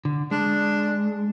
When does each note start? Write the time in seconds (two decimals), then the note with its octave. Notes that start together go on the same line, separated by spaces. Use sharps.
0.05 D3
0.31 G#3 D4